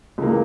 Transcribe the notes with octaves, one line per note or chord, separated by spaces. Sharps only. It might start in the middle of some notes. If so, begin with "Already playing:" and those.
C#2 C#3 E3 A#3